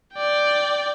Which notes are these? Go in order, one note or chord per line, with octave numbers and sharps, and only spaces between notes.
D5 G5